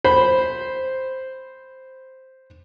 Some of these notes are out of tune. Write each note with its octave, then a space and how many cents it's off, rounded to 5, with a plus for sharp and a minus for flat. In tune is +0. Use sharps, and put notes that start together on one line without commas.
C5 +0 B5 +0